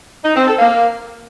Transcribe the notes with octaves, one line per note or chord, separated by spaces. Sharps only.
D#4
C4
A4
A#3